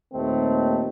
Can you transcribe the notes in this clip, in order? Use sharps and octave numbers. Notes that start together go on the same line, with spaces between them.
D#2 A#2 D#3 A3 C4